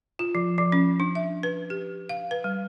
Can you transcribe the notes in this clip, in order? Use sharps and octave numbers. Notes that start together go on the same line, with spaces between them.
F4
F3
F3
C#4
D4
E5
B4
G4
F5
B4
G3